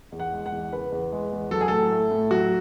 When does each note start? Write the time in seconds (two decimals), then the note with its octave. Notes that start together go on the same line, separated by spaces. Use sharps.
0.12 E2
0.19 F#5
0.33 G#3
0.46 F#5
0.52 E2
0.73 C#3 B4
0.92 E2
1.12 G#3
1.32 E2
1.51 F#3 A4
1.61 G#4
1.68 A2 A4
1.91 A3
2.11 A2
2.31 F#3 F#4